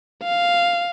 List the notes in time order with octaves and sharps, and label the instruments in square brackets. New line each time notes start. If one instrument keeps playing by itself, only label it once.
[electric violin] F5